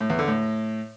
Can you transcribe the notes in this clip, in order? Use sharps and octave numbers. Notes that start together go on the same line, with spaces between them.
A2
E2
D3
A2